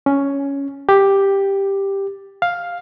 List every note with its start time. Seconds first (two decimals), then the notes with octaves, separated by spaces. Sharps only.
0.06 C#4
0.89 G4
2.42 F5